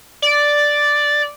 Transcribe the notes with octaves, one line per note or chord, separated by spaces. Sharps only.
D5